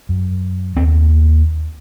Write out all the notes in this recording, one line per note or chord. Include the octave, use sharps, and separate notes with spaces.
F#2
D#2 C4